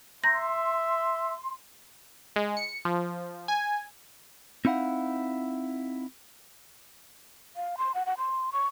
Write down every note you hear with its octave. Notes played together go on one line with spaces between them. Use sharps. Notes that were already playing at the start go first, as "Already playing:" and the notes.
E5 A#5 C6 G6 A#6
G#3
C#7
F3
G#5
C4 D#4 E4 F5 F#5
F5
C6
F#5
F#5
C6
C#6